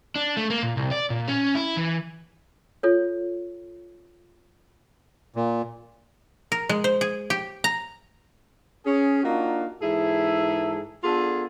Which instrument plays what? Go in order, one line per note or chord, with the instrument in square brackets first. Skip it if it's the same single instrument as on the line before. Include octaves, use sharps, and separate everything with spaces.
[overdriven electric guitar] D4
A3
A#3
A#2
C2
D5
A#2
C#4
E4
E3
[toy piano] F4 A4 C#5
[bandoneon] A#2
[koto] A#4
G#3
C5
G#4
G4
A#5
[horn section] C#4 G#4
A#3 D4 D#4 F4 F#4
G#2 E3 E4 G#4 A4 E5
B3 D4 F4 G#4 A4